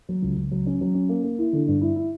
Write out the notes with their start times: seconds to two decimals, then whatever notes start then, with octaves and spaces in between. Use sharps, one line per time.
0.09 F#3
0.22 C#2
0.37 C#2
0.52 F#3
0.67 C#4
0.81 F#3
0.95 C#4
1.09 A#3
1.24 A#3
1.39 E4
1.53 D3
1.68 G2
1.81 E4
1.96 E4